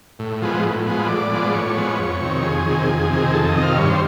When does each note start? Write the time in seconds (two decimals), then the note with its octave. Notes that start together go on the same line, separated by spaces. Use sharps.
0.19 A2
0.42 F3 G#3 B3
0.63 A2
0.86 F3 G#3 B3
1.08 A2 D5
1.32 F3 G#3 B3
1.54 A2 C#5
1.77 F3 G#3 B3
1.98 F2
2.21 C3 D#3
2.43 F2 G#4
2.66 C3 D#3
2.88 F2
3.10 C3 D#3
3.33 F2 A4
3.48 D#5
3.55 C3 D#3
3.63 F5
3.78 G2 C#5
3.90 C5